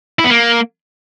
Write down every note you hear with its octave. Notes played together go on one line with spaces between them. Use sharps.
E4
B3
A#3